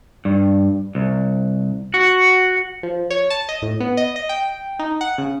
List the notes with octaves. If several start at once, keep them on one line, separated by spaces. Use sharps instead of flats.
G2
C2
F#4
F3
C#5
A5
D#5
A2
B3
D#5
D#5
G5
D#4
F#5
C#3